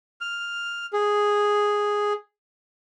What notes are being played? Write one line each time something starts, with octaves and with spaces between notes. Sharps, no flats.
F6
G#4